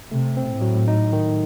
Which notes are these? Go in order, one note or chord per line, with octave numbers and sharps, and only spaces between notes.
C3 A3
C4
A2
F#3
D#4
D#3